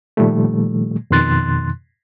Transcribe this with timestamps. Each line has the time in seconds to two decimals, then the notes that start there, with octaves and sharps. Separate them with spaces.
0.17 A#2 D#3 F3 G3 A3
1.10 F2 B2 D#3 C6 F#6 A6